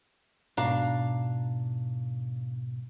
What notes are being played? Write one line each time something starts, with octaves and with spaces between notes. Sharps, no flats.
G#2 B2 D4 F5 A#5